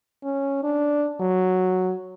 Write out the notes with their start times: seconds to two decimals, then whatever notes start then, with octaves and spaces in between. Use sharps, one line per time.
0.24 C#4
0.64 D4
1.20 F#3